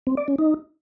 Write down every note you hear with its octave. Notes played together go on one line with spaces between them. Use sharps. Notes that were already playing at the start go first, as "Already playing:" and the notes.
C4
D5
C#4
D#4